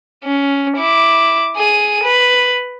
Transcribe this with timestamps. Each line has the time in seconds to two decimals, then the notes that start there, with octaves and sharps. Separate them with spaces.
0.24 C#4
0.78 E4 D6
1.56 G#4 D#7
2.03 B4